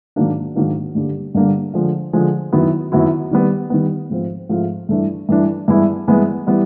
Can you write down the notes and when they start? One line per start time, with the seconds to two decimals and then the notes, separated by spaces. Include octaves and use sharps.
0.16 G#2 D#3 F#3 A#3 D4
0.55 G#2 D#3 F#3 A#3 D4
0.95 G2 D3 G3 A#3 D4
1.35 G2 D3 G3 A#3 D4
1.74 D3 F3 G#3
2.13 D3 F3 G#3
2.53 F#2 D#3 F#3 B3 E4
2.92 F#2 D#3 F#3 B3 E4
3.31 D#3 G3 B3
3.70 D#3 G3 B3
4.10 G#2 F3 A3 C4 F4
4.49 G#2 F3 A3 C4 F4
4.89 G2 E3 A3 D4
5.29 G2 E3 A3 D4
5.68 G2 E3 G#3 B3 E4
6.08 G2 E3 G#3 B3 E4
6.46 E3 G3 B3